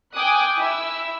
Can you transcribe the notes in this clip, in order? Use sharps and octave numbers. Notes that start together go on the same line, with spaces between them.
G5 G#5 D6 D#6 F#6
E4 E5 E6